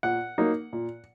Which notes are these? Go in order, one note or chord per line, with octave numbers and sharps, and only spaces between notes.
A#2 F#5
F#3 A#3 D#4
A#2